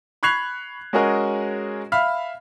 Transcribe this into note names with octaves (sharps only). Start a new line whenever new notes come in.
B5 C#6 F#6 G#6 C7 F7
G#3 C#4 F#4 G#4 A#4 D#5
E5 F5 B5 F6